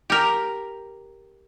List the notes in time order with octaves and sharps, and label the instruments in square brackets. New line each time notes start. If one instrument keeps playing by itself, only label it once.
[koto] G4 A#4